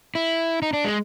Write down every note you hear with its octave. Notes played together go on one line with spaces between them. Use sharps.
E4
D#4
D4
G#3